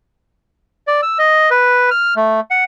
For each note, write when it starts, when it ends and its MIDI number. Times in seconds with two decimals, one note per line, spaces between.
0.87 1.01 74
1.02 1.18 88
1.19 1.50 75
1.51 1.90 71
1.91 2.14 89
2.16 2.40 57
2.51 2.64 78